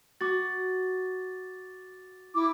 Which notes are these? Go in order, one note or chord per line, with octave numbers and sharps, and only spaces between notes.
F#4 D6 A6
E4 D6